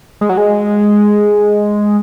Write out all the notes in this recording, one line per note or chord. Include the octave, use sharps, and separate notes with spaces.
G#3
F#3
G#3